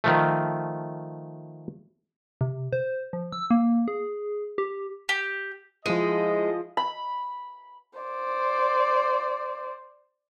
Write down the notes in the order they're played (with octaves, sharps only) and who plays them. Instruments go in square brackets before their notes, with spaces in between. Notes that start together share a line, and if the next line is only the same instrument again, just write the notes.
[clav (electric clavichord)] D#3 F3 A3
[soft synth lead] C3
C5
F3
E6
A#3
G#4
G4
[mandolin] G4
[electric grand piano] F3 D#7 [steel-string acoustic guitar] G#3 [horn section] E4 G#4 D#5
[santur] B5
[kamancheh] C5 D5